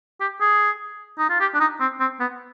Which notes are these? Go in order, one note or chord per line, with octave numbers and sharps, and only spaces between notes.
G4
G#4
D#4
F4
G4
D4
D#4
C4
C4
B3